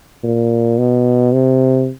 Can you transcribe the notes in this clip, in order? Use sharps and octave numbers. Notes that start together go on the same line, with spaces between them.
A#2
B2
C3